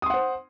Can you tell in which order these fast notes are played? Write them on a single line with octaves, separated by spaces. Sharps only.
D#6 C6 F#5 C5